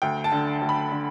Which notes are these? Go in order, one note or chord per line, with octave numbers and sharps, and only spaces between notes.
D2 G5
A5
D3
D2
B5
D3